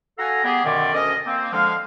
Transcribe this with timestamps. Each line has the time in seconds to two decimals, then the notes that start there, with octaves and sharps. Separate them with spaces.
0.19 F#4 A4 F5 F#5 G#5 A#5
0.44 G3 B3 G4 G#4
0.65 F#2 B2 D3 D#3 D5
0.94 D2 C#4 A#4 D#5
1.25 A#3 C4
1.53 D3 F3 G#3 F5